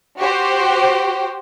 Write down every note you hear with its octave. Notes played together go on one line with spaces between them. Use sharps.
F#4 G4 C5